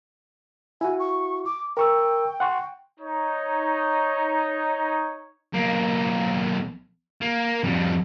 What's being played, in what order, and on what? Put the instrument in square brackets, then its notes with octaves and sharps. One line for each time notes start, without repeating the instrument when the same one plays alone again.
[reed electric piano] E4 F#4 [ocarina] G#5
[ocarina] C#6
D6
[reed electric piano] A#4 C#6 E6 [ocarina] G5
[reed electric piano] F#5 C6 C#6
[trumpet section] D#4 C#5
[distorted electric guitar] B1 A#3
A#3
F2 G3